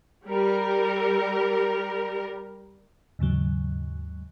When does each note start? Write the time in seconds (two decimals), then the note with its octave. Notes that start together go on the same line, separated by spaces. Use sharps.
0.27 G3 A#4
3.19 D#2 G#2 C#3 F#3